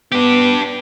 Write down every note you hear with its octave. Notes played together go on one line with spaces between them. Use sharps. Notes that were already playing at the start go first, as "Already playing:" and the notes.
B3 D4 G4